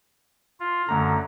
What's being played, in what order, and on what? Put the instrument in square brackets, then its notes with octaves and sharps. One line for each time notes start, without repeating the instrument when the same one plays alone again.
[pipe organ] F4
[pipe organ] F#2 D3 [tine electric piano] A3 A#5